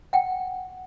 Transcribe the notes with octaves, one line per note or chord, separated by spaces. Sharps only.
F#5 G5